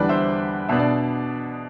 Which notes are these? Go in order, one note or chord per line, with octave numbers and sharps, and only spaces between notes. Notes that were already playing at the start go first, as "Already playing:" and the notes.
Already playing: E2 D3 G3 D4 B4 D5
C5 E5
B2 B3 D4 E5
D5